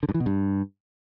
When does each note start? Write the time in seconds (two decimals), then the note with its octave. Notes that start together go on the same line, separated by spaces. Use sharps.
0.03 D3
0.09 G2
0.14 E3
0.20 B2
0.26 G2